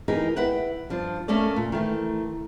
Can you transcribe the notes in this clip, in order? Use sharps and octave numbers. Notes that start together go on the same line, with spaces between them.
E3 D#4 G4 G#4 A#4
B4 E5 F#5 G5
G2 F3 D4
A3 A#3 C#4 A4 D5
A#2
D#3 E3 A3